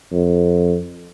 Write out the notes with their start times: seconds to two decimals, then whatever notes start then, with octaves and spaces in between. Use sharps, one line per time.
0.12 F2